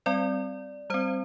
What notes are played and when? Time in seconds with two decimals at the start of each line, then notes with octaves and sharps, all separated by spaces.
0.06 G3 C4 D5
0.90 G3 C4 C5